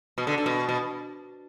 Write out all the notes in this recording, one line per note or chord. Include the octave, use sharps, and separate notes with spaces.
B2
D3
D3
B2
B2